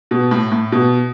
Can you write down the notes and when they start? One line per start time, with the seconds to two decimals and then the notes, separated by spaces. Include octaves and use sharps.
0.11 B2
0.31 A2
0.52 A2
0.72 B2